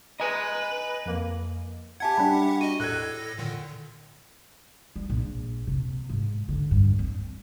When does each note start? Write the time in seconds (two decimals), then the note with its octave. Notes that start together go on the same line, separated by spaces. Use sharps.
0.20 B4 D#5 G#5 A#5
1.06 F2 A#3
2.00 G4 E5 F#5 G#5 A5 G#6
2.17 G3 D4 B5
2.61 F#4 D#5 D#7
2.80 A2 A4 F#6 G#6 A#6
3.38 A#2 D3 D#3
4.96 G3
5.10 A#1
5.67 C3
6.09 G#2
6.49 D3
6.71 G2
6.99 C4